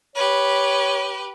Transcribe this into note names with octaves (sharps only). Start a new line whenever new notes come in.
G4 B4 C#5